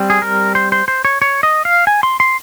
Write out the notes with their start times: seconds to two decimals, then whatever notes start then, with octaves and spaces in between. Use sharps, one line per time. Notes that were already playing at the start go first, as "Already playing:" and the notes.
Already playing: G3 C4
0.10 G#4
0.22 A#4
0.55 C5
0.72 C5
0.88 C5
1.05 C#5
1.22 C#5
1.43 D#5
1.65 F5
1.87 G#5
2.03 C6
2.20 C6